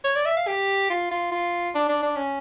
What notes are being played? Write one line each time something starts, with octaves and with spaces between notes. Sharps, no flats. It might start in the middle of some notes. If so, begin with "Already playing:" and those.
C#5
D5
E5
F5
G4
F4
F4
F4
D4
D4
D4
C#4